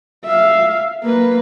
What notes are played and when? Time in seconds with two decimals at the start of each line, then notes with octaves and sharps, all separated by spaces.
0.24 E5 F5
1.03 A#3 B4